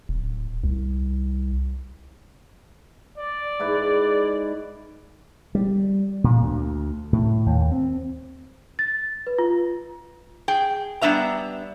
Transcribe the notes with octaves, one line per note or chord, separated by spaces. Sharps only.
D1
C2
D5
G#2 E4 B4
G3
A#2
D2
A2
D#2
C4
A6
B4
F4
G#4 G5
G3 B3 D4 E5 A#5